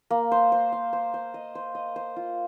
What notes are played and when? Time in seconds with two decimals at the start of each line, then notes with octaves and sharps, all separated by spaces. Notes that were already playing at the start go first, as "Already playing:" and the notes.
0.10 A#3
0.32 C5
0.52 C5
0.72 F5
0.93 C5
1.14 C5
1.34 D#5
1.55 C5
1.75 D#5
1.96 C5
2.16 F4